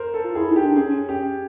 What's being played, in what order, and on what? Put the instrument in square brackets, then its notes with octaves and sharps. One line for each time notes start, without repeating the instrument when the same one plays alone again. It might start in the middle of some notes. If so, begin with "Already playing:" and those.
Already playing: [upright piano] A#4 C5
A4
[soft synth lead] F4
[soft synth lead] E4 [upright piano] G#4
[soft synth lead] D#4
[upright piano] G4
[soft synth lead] D4
[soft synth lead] C#4 [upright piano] G#4
[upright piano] G4